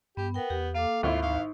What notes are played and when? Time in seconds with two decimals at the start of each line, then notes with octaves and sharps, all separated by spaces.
0.17 G2 B3 G4
0.34 B3 A#4 G5
0.50 E2 G4
0.75 A#3 A4 F5 D6
1.03 G#1 D2 E4 F4
1.23 D#4 F5